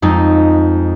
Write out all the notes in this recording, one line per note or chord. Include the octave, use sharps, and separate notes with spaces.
F2 G#3 D#4